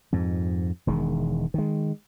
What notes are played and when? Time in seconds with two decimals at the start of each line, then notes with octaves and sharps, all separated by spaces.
0.12 F2 G#2
0.87 E1 D#3 G#3
1.54 D#3 G#3